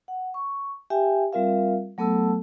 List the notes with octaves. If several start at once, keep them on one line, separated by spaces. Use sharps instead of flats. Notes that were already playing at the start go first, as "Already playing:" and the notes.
F#5
C#6
G4 E5 G5 G#5
G3 C4 F4 A#4 E5 F5
F#3 A3 B3 A4 A5 E6